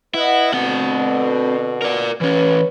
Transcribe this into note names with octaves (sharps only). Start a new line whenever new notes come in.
E4 B4 D#5 F#5
B2 D3 C4 F#5
A#4 D5
E3 C#4 B4 C#5